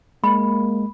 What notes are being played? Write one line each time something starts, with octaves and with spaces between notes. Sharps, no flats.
G#3 A#3 B5